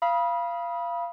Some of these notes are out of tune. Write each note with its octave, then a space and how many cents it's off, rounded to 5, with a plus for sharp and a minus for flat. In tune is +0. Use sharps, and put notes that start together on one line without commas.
F5 -20 B5 -25 D#6 +20